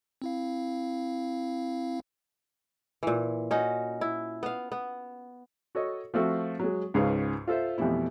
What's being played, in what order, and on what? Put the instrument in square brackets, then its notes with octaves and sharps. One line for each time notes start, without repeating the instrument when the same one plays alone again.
[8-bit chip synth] C4 E4 F5
[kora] A#2 E3
C#4 D#4 F#4
E4
B3 F5
B3
[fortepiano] F#4 A4 C#5 D#5
F3 A3 C4 F#4 A4 E5
F#3 G#3
C#2 G#2 C#3 G#4 B4 F5
F4 A4 C5 E5
F2 B2 E3 G3 A3 E4